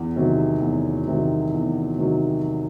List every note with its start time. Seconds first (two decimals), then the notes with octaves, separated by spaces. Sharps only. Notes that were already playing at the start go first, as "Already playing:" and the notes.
Already playing: E2
0.16 C3 D#3 F#3
0.62 E2
1.07 C3 D#3 F#3
1.53 E2
1.98 C3 D#3 F#3